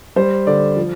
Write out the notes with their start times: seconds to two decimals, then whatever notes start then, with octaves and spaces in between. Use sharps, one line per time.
0.16 G3 C5
0.47 D3 D5
0.77 F3